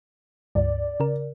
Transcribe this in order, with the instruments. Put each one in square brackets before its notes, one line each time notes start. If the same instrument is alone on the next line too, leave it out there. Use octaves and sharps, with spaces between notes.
[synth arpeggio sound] C#2 G2 [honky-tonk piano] D5
[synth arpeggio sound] C#3 A#4